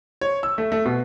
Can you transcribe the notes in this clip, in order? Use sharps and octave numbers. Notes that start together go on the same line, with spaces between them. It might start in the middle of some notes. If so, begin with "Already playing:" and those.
C#5
E6
A3
A3
B2